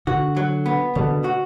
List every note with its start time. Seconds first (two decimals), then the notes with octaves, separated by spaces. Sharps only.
0.07 D3 F#4
0.36 F#3
0.66 B3
0.95 B2 D3
1.24 F#4